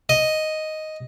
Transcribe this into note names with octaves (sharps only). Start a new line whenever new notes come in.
D#5